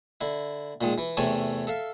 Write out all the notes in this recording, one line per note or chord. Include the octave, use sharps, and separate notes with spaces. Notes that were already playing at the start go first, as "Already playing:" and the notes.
D3 E4
A#2 D#3 G#3
E3
E2 C3 A3 C#5 G#5 A5
A4 E5 F5